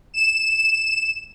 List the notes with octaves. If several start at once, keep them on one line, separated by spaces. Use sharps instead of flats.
E7